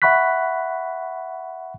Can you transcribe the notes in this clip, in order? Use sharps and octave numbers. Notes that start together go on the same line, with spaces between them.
E5 F#5 B5 C#6 F#6 B6